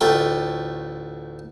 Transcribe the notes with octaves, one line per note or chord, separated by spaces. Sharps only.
A1 D2 A3 F4 G5